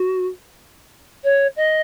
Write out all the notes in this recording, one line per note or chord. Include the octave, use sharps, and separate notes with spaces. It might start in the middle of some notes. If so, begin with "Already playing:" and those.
Already playing: F#4
C#5
D#5